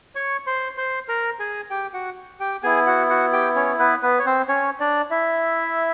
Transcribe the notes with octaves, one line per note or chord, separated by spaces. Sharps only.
C#5 C#6
C5 C6
C5 C6
A#4 A#5
G#4 G#5
G4 G5
F#4 F#5
G4 G5
B3 E4 G#4 G#5
F#4 F#5
F#4 F#5
G4 G5
C#4 C#5
B3 B4
B3 B4
C#5
C4 C5
C#4 C#5
D4 D5
E4 E5